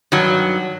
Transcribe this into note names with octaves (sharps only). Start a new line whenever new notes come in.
G2 D#3 F#3